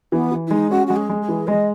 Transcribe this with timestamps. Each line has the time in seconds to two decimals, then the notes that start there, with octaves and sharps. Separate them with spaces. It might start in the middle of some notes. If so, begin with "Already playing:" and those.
0.12 E3 B3
0.32 E3
0.47 E4
0.50 G#3 D#4
0.70 C#4 F#4
0.87 G#3 F#4
0.96 G#4
1.09 G#3
1.21 G#4
1.28 E3
1.47 G#3 D#5